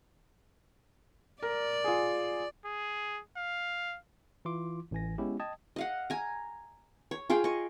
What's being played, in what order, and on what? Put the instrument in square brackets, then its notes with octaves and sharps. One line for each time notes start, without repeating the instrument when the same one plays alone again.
[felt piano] A#4 [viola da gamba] D5
[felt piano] F4 G#4
[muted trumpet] G#4
F5
[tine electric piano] E3 E4 F4 C6 D6
A1 E3 G#5 A#6
G#3 B3 C#4 E4 G4
D#5 G5 A5 D#6 G#6
[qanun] D#5 F5 F#5
G#5 A#5
C#5
F4 G#4 F5 G5
D#5 C#6